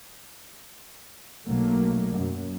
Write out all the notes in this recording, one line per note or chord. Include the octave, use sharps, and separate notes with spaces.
B1 F#3 A3 A#3
F#2